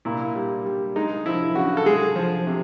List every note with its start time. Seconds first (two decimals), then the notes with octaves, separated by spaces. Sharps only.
0.05 A#2 E4
0.35 G3
0.66 G3
0.96 G#3 D#4
1.26 F3 E4
1.55 C#3 F#4
1.77 A4
1.86 G#3 G#4
2.16 F3
2.47 C3